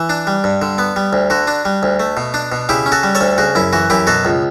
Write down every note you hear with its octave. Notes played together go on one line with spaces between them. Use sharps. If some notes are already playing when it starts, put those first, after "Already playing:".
Already playing: E3
D4
G3
G2
D3
B3
G3
D2
D3 F#4
D4
G3
D2
A3
B2
D4
B2
C#3 E4 G4
C#4
F#4 A4
G3
A4 C#5
D2
C#3 F#4
F#2 E4
E3 F#4
F#2 E4 G4
B2 F#4 A4
C#2